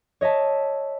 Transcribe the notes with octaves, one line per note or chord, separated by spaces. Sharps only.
C#5 D#5 E5 A5